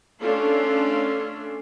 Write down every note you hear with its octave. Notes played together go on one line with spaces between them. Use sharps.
A3 C#4 D4 F4 A4